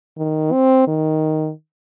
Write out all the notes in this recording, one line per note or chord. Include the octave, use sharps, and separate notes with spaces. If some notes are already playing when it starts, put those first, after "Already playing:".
D#3
C4
D#3